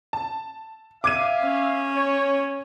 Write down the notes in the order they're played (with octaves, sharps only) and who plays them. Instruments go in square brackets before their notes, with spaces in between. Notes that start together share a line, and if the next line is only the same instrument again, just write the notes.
[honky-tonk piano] A5
[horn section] E5 F5 [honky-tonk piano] D6 G#6 D#7
[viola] C#4
[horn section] C#5